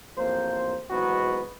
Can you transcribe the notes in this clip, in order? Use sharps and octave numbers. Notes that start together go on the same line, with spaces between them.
A1 F2 A#3 C5
G#1 E2 G#2 F#3 B3 F#4